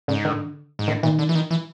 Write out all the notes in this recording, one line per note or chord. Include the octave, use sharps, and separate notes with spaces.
G#2 C#3
D3
G#2
A2 D3
A#2 D#3
D3
E3
D#3
E3